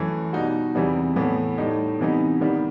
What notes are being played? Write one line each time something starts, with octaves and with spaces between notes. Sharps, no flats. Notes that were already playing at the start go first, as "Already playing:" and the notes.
Already playing: F#2 E3 A3
B2 G3 D#4 F#4
E2 C3 E3 G3 B3
A2 E3 B3
A2 G3 D#4
C3 E3 B3 D#4
D#3 G3 B3